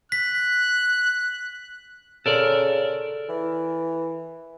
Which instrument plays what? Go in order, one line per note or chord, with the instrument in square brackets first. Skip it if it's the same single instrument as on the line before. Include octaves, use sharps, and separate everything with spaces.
[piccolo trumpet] F#6 [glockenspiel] B6
[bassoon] C#3 [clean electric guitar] A4 A#4 D5
[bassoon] E3